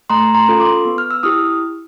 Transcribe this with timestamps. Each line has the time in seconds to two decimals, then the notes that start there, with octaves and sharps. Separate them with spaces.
0.10 A3 A#5 C6
0.35 A#5 C6
0.48 C#4 F4 A4
0.60 C6 D6
0.85 B3
0.98 F6
1.11 E6
1.23 E4 G4 D#6 F6